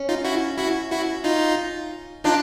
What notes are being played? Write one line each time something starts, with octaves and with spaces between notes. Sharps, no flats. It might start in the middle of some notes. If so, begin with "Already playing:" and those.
Already playing: C#4
D#4 F4
E4 F#4
E4 F#4
E4 F#4
D#4 F4
D4 D#4 F4